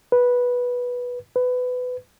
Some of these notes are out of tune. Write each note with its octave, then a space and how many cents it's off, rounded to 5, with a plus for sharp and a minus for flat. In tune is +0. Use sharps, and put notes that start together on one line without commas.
B4 -10
B4 +20